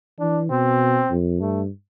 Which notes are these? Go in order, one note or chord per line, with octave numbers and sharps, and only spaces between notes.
E3 D4
B2 C4
F2
G2 A3